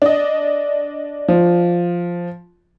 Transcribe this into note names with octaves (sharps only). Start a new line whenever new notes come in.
D4 D#5
F3